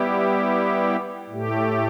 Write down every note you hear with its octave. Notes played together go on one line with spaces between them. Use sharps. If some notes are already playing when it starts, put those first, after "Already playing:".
Already playing: G3 B3 E4 G4
A2 A3 G4